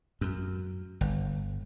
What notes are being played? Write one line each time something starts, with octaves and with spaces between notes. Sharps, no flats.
F#2
G1